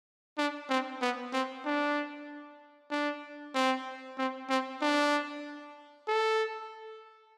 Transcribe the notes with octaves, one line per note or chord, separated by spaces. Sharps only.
D4
C4
B3
C4
D4
D4
C4
C4
C4
D4
A4